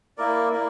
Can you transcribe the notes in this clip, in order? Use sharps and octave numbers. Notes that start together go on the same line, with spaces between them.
A#3 E4 A#4 D5
A#3 E4 A#4 D5